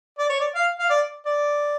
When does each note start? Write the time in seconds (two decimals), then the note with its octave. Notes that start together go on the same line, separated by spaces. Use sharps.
0.19 D5
0.29 C#5
0.40 D5
0.55 F5
0.79 F5
0.90 D5
1.26 D5